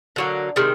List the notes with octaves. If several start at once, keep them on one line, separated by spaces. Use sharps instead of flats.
D3 F#3 A#3
C3 D#3 G#3